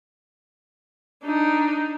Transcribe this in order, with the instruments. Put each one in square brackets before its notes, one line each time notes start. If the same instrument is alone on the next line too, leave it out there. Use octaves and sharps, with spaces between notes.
[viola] D4 D#4